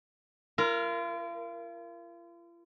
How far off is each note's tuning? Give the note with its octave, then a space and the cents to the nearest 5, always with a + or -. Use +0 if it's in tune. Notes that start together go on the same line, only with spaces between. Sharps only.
F4 -40 A#4 +0